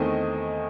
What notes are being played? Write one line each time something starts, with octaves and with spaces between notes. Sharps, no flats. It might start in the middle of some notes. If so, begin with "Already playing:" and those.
Already playing: E2 D#3 A3 C4 D#5